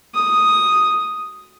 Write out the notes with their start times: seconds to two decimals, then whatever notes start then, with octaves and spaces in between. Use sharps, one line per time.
0.14 D#6